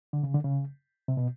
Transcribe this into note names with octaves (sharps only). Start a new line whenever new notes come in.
D3
C#3
D3
C#3
C3
B2